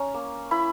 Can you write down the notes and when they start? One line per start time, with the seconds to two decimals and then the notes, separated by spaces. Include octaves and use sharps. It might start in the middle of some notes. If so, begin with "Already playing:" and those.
Already playing: C#4 A#5
0.14 A#3
0.51 E4 B5